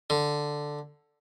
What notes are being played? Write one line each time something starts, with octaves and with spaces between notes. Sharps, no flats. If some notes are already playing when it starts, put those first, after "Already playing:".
D3